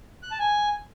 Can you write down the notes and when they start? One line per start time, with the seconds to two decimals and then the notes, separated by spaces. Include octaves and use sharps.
0.23 F#6
0.31 A5
0.39 G#5